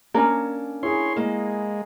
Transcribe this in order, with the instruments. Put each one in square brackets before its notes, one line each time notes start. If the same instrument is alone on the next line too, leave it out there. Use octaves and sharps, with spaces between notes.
[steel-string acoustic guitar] A#3 C#4 D4 [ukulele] A#4
[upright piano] E4 G#4 [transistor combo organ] C#5 C6
[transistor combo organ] G#3 [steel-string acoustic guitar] A#3